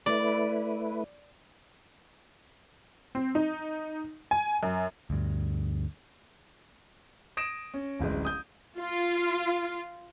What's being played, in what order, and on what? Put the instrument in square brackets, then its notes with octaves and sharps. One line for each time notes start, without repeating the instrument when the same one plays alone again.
[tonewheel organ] A3 E4 B4 [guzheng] D5
[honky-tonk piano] C4
D#4
G#5
F#2
[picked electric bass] D2 G2
[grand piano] D#6 A#6 D7 E7
C#4
D1 A1 G#3
D#6 G6
[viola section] F4